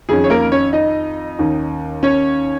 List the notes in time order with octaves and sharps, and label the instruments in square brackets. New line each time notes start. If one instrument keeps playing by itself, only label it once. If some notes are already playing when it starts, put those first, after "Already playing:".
[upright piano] F2 D#3 C#4 G#4
C#5
A#3 A#4
C#4 C#5
D#4 D#5
D#2 D#3 C#4
C#4 C#5